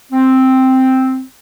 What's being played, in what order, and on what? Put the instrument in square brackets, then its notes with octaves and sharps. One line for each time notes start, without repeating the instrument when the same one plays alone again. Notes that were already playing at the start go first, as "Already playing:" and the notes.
[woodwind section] C4